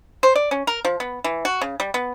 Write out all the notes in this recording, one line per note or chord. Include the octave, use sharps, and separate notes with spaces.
C5
D5
C#4
A#4
F3
B3
E3
F#4
C#3
G3
B3